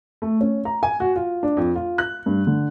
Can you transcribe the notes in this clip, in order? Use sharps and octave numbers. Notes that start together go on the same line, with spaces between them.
A3
C#4
A#5
G#5
F#4
F4
D4
F2
F4
F#6
G2
D3